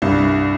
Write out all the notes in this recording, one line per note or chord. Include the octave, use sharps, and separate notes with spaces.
C2 G2